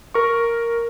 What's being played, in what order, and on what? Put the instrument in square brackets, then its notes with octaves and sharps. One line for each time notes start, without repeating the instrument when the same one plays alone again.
[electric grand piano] A#4 C#6